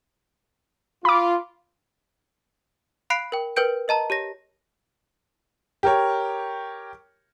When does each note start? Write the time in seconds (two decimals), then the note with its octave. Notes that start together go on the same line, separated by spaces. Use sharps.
1.05 F4 B5 D6
3.10 F5 B5 F#6 C7 D7
3.32 A#4 G5
3.56 A#4 B4 G5 G6 D7
3.88 A#4 D#5 A5 A#5
4.10 G4 C#5 A#6
5.83 G4 A#4 C#5